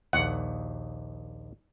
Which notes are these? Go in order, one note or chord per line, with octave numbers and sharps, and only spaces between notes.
A#1 D#2 F#5